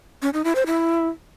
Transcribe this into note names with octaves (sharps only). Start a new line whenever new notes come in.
C#4
D#4
E4
C5
E4